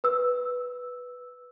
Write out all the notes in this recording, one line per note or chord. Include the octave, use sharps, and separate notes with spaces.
B4 E6